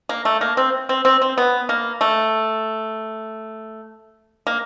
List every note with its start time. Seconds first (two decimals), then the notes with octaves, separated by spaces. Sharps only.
0.09 A#3
0.25 A3
0.41 A#3
0.57 C4
0.89 C4
1.05 C4
1.22 C4
1.38 B3
1.69 A#3
2.01 A3
4.47 A#3